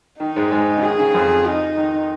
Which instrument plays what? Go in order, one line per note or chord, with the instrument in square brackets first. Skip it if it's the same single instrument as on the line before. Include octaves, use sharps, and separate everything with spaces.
[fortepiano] D#3 [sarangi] D#4
[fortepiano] G#2 G#3
G#2 G#3
C#3
[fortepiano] D#3 [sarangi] G#4
[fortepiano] C#3
F2 F3
[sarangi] D#4
[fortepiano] D#3